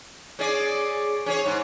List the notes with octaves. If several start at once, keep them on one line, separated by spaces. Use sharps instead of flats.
C#4 G#4 D5
C#4 G#4 C#5
G#2